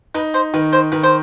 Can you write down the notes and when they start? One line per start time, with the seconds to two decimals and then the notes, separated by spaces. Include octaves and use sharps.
0.14 D#4 B4
0.34 C5
0.54 D#3 B4
0.73 C5
0.92 D#3 B4
1.03 C5